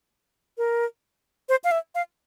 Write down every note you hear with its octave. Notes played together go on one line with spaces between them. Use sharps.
A#4
C5
F5
E5
F5